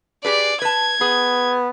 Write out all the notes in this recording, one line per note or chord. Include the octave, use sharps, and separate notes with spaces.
G4 G#4 B4 D5
B4 A5 G#6
B3 G#4